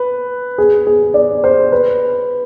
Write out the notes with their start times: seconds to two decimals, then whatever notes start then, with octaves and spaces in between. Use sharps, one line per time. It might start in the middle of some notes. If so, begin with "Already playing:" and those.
Already playing: B4
0.58 G#4
0.87 G#4
1.14 D5
1.44 C5
1.72 B4